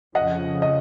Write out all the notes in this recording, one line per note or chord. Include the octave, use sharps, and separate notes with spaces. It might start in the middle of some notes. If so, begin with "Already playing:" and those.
F2 C#3 F3 D#5 F#5
D#5